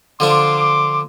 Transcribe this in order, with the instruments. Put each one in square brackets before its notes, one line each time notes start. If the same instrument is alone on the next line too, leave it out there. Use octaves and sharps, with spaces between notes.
[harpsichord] D3 F3 D4 [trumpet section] C6 D6